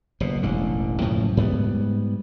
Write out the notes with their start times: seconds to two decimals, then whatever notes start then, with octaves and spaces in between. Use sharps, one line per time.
0.20 F#1 B2
0.43 E1 A1 D3
1.01 F#2 A2 C#3 F3
1.37 G#2 G3 B3